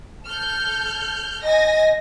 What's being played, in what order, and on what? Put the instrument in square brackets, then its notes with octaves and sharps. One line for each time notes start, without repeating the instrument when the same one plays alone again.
[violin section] A4 F6 G6
[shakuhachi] D#5 [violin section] G#5 A#6